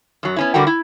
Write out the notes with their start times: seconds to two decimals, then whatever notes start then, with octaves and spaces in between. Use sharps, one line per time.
0.23 F#2 F#3
0.36 B3 C#4 E4
0.54 D3 G3 F#4 A#4 G5
0.67 E4